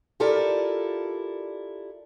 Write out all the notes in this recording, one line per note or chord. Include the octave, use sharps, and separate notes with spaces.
E4 F4 G4 A4 A#4 D5